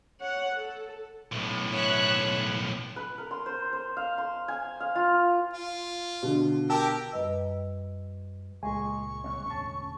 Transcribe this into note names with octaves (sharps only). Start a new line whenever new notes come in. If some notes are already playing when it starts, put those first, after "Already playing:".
C#5 F#5
A4
B1 A2
C#5 E5 F#6
B4
A#4
C6
C5
C5
F5
C6
G#5
F5
F4
F4
B2 D3
G4 A#4 G5 A5 E6
F#2 G3 B4 D#5 E6
C#2 A#2 G#3 G#4 G#5 C#6
C2 C#4
E1 A1 D2 C#4 A5